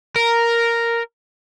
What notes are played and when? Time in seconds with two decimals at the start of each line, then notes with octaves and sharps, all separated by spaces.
0.16 A#4